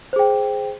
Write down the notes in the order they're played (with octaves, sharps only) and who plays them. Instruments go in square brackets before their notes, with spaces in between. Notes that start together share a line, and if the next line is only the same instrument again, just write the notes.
[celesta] C5
G#4
G5